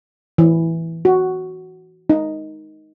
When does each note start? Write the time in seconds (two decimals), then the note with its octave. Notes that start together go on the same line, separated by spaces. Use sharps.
0.38 E3
1.05 F#4
2.10 D#4